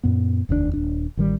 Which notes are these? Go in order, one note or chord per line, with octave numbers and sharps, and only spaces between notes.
F#2 A#2 B3
F1 D#2 A2 D4
D#1 D4
A1 D#3 G3